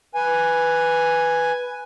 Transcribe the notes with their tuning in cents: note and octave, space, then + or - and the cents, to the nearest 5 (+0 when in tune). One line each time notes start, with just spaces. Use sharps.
B4 +0 G#5 +0